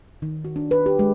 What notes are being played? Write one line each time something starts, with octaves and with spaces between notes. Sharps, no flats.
D#3
F#4
D4
B4
G4
G#3